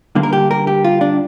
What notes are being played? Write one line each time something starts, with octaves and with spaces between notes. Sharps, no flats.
G2 D3 A#3
A#4
G4
A#4
G4
F4
D4